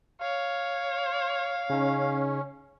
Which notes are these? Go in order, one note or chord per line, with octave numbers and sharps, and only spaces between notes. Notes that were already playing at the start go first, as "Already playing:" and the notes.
C#5 F5
C#3 C#4 D#4